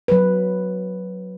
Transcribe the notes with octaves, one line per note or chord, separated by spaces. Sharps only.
F#3 B4